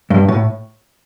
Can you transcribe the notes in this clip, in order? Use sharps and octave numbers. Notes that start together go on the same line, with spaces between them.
G2
A2